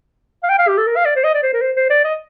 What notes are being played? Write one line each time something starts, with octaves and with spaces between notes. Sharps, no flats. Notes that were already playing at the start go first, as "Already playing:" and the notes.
F5
G5
F5
G4
A4
A#4
F5
D5
C5
D#5
D5
C5
A#4
C5
C5
D5
D#5